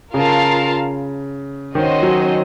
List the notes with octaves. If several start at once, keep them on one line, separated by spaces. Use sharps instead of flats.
C#3 F4 A#4 F5 A5
D#3 C#4 F#4 C5 D#5
F#3